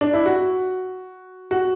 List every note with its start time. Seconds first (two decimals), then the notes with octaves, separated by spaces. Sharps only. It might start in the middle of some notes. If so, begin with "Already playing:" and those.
0.01 D4
0.13 E4
0.26 F#4
1.51 F#4